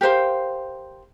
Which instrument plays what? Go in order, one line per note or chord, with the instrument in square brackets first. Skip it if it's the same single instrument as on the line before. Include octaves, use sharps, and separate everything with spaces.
[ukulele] G4 A#4 C5 F5